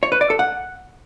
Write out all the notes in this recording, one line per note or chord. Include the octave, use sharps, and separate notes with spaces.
C#5
B4
D5
A4
F#5